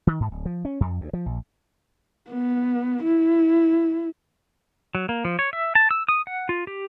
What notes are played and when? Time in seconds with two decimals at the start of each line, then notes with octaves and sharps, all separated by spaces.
0.07 D#3
0.20 G#2
0.32 D1
0.45 F3
0.65 C#4
0.80 F2
1.01 D2
1.13 F3
1.26 A#1
2.30 B3
3.03 E4
4.95 F#3
5.09 A#3
5.25 F3
5.39 C#5
5.53 E5
5.75 A5
5.91 E6
6.09 D#6
6.27 F#5
6.49 F4
6.67 G4